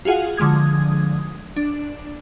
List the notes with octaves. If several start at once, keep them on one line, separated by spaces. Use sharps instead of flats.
F4 F#4 G#4 F5 F#5
D3 F3 G#3 D#6 G#6
D4